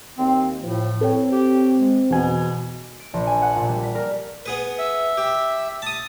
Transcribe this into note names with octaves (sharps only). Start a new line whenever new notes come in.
D#2 C4
A2 F3
C4 A4 C#5 G5
G4
G#3
E2 B2 G#5
D7
A#1
G#5
F#5
A#2
G3
B6
A#4
B3 G#4 B4
E5
G4
A5 D#6